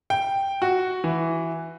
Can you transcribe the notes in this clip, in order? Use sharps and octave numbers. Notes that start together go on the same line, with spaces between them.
G5
F#4
E3